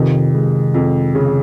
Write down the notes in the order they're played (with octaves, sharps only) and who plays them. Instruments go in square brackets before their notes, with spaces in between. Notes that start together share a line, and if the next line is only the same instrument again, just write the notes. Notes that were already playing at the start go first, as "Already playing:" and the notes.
Already playing: [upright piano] F2 [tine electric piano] C3 D#3
[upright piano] G#3
F2
C#3